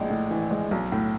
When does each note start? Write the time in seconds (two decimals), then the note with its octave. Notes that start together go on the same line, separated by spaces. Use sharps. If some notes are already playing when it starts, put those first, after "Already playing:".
Already playing: A#1 A2 G#3
0.10 A2
0.31 E3
0.51 G#3
0.71 B1
0.92 A2